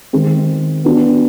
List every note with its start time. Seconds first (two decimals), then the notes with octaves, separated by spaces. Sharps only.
0.13 D#3 G#3 C4
0.84 B3 D4 F#4